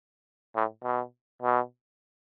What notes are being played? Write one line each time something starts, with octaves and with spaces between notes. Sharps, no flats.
A2
B2
B2